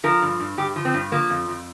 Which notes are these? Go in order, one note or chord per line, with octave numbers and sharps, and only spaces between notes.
F3 A#4
G2
G2
G2 G4
F3
C4
G2
F3 A#3
F2
F2